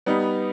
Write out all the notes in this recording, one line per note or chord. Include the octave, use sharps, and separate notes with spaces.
G3 B3 D#4